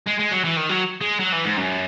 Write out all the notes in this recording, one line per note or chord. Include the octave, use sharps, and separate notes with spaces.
G#3
G#3
F#3
E3
D#3
F#3
G#3
F#3
E3
G#2
F#2